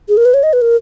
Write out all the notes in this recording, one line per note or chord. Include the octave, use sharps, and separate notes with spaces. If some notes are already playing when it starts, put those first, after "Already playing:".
G#4
A#4
B4
C#5
D#5
B4
A#4